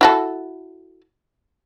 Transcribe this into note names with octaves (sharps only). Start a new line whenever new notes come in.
E4 F#4 A4